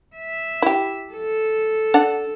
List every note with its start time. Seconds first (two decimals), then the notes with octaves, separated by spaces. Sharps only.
0.16 E5
0.62 E4 G4
1.13 A4
1.94 D4 D5 F#5